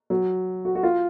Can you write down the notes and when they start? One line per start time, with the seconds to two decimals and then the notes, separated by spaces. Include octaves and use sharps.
0.10 F#3
0.65 F#4
0.75 F#4
0.83 F4